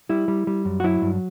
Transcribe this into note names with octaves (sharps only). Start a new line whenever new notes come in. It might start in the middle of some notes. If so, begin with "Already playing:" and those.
G3 E4
G3
G3
F#2
F#4
F#3 E4
G2